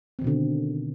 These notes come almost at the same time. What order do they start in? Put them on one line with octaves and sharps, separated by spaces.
C4 D#3 B2 D3